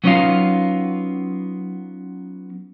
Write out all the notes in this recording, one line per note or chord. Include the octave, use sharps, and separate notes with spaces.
F#3 B3 C#4 D#4 F4 F5